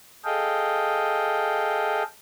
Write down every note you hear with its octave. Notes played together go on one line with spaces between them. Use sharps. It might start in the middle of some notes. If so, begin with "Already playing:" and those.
G#4 A4 D#5 F5 G5